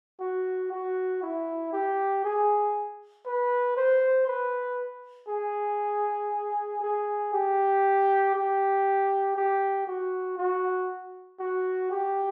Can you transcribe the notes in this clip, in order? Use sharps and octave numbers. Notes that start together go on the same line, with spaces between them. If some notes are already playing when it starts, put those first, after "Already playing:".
F#4
F#4
E4
G4
G#4
B4
C5
B4
G#4
G#4
G4
G4
G4
F#4
F#4
F#4
G4